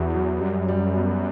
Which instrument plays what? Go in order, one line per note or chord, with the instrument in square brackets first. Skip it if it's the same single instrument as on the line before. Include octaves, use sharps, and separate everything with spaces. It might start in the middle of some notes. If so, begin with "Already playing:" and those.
Already playing: [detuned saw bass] E2 [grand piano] F#4
[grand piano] F#3
[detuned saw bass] F#2 [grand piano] G3
[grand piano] G3
B3